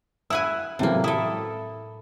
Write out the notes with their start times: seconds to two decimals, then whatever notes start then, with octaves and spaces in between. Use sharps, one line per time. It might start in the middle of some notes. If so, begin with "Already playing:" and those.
0.30 E4 F#5 G#5 E6
0.79 A2 C3 E3 F#3 A#3
1.04 E4 A4 D#6